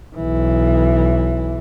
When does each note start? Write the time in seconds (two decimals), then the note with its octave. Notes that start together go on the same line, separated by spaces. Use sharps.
0.16 B1 E3